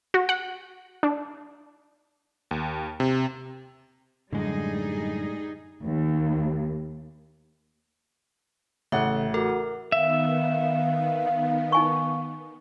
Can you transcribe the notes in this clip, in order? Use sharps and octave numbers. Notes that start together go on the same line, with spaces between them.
F#4
F#5
D4
D#2
C3
F#2 A2 D3 G3 G#3 D#4 G#4
D#2
A1 C#3 A4 E5 F#5
F#4 A4 A#4
D#3 B3 E5 F5
D#4 G#5 C#6